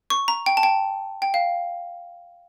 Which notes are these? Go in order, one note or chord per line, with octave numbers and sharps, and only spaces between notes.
C#6
A#5
G5
A5
G5
G5
F5